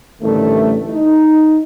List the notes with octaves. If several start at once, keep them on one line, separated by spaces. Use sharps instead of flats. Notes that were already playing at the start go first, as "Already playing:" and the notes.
A1 D3 D#3 G3 A3
D#4